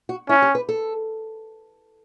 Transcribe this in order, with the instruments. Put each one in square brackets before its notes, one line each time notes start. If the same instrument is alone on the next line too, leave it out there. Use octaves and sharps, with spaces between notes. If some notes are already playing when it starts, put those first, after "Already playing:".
[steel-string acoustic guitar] F#4
[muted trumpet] C#4 [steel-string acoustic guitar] E4
[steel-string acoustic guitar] G4
B4
A4